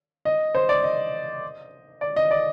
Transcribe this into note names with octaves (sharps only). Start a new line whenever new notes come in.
D#5
C5
D5
D#5
D5
D#5
D5